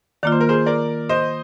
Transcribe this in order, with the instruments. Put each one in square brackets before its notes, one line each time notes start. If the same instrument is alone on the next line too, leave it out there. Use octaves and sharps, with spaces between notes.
[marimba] D#3 A#3 F4 [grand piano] D5
[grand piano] C5
A#4
G#4 C5
A#4 D5
C5 D#5